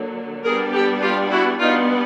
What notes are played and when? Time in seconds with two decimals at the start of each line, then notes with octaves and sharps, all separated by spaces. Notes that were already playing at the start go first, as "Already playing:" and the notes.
Already playing: D3 F#3 A#3
0.44 G3 B3 D4 G#4 A#4
0.73 G4 A4
1.02 F4 G4
1.31 E4 F#4
1.60 G3 B3 D4 D#4 F4